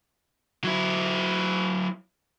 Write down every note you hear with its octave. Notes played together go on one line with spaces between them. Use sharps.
F#3 E4